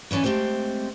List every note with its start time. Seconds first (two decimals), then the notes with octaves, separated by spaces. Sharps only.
0.11 D#2 E3 C#4 D5 G#5
0.24 G#3 A3 C4 G4 C5